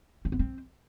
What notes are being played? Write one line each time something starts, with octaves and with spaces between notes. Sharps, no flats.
C#4
B3
C4